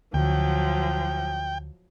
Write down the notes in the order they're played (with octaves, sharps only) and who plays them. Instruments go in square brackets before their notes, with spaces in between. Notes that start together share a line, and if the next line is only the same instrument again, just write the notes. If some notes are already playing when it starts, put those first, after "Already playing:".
[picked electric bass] D2 [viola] F3 F#3 [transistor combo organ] G5